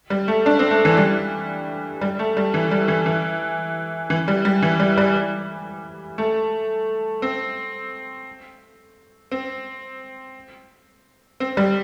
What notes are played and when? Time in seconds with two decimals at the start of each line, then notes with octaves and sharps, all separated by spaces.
0.10 G3
0.28 A3
0.46 D4
0.59 C4
0.71 A3
0.85 E3
0.97 G3
2.01 G3
2.19 A3
2.37 G3
2.54 E3
2.71 G3
2.88 E3
3.06 E3
4.10 E3
4.28 G3
4.45 G3
4.62 E3
4.80 G3
4.98 G3
6.18 A3
7.22 C4
9.32 C4
11.40 C4
11.57 G3